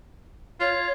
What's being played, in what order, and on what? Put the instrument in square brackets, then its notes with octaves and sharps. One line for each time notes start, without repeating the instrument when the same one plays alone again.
[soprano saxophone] F4 [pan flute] C#5